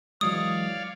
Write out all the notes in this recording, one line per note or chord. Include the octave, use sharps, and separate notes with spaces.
E3 F#3 G#3 C#5 D5 F5 D#6